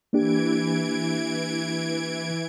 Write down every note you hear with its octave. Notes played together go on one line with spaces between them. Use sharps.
E3 A#3 D4 G4 G#6 D7